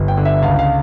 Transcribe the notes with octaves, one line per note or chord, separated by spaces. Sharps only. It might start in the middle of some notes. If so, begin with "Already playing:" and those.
Already playing: G1
G5
D3
E5
C#2 F5
F5